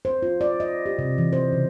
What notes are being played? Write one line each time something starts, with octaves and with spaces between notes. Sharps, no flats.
C5
F4
D5
D#5
G4
C3
E3
C5
C#3